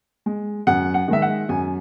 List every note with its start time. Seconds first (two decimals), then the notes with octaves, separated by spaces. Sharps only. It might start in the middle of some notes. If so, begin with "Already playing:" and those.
0.26 G#3
0.67 F#2 F#5
0.94 F#5
1.08 D#3 G#3 E5
1.22 F#5
1.49 F#2 G#5